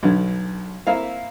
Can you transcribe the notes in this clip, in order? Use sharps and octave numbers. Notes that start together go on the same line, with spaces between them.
B1 D3
A#3 C4 E4 E5 F5